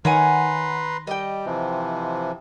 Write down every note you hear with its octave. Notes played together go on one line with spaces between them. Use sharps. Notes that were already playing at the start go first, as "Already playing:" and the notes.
D#3 B4 C#5 F#5 G#5 A#5 C6
G3 D#5 G5
C3 E3 F3